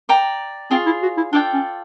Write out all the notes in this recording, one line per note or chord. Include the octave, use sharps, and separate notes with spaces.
D5 G5 A#5
C4 F4 G#4 C#5
E4
F#4
E4
D4 F4 A4 D5 G5
C#4